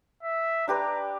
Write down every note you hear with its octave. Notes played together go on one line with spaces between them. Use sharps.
E5
D4 G4 B4 A#5